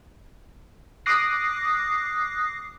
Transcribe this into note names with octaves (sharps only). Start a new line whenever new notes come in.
D6 D#6 F#6 A#6 C7